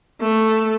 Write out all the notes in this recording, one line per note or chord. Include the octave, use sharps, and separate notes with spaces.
A3